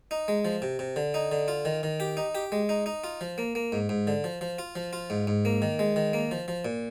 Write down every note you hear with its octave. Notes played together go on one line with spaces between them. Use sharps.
D#4
G#3
F3
C3
C3
D3
D#4
D3
F4
D#3
D#3
G4
D#4
G4
G#3
D#4
D#4
F4
F3
A#3
A#3
G#2
G#2
D3
F3
F3
F4
F3
F4
G#2
G#2
A#3
D#3
G#3
D#3
A#3
F3
F3
A#2